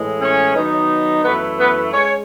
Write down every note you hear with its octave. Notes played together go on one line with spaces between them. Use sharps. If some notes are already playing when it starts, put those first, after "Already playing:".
Already playing: A2 E3 G#3
C#4 C#5
D#3 F#3 B3 D#4
F#2 E3 A3 B3 E4 B4
B3 B4
G#3 C#4 C#5